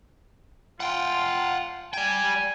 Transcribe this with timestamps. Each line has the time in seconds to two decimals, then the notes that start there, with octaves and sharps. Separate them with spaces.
0.80 F4 F#5 G5
1.94 D5 G5 G#5